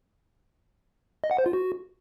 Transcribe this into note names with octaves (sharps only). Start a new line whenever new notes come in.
D#5
F#5
C5
F4
F#4